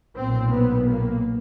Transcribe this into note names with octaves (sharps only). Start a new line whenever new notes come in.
B1 A#2 C4
B3
A#3